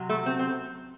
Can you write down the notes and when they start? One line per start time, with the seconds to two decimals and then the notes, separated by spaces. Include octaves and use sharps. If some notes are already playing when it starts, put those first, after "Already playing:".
Already playing: C3 F#3
0.09 A3
0.26 C4
0.39 C4